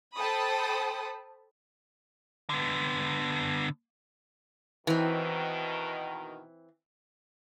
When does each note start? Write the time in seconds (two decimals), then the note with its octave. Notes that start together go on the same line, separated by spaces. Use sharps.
0.17 A4 C5 G5 A5 B5 D#6
2.50 D3 B3
4.87 B2 D#3 E3 C4